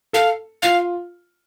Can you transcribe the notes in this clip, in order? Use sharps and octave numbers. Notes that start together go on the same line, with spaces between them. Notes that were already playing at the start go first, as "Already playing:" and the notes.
A4 F5
F4 F5